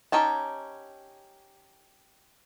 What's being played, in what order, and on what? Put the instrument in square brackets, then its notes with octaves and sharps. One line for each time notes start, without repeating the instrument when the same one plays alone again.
[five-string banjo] C#4 D#4 G4 A5